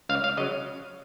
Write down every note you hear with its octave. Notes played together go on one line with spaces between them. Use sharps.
C#2 F5
F5
C#3 F#3 D#5